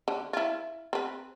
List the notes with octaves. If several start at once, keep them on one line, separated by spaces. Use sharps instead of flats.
D3
E4 F4
C4 B4